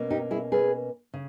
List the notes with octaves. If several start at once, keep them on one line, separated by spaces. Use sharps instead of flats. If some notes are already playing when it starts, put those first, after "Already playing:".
Already playing: B2 A#3 C#4
D#4 G4
E4 G#4
G#4 B4
C#3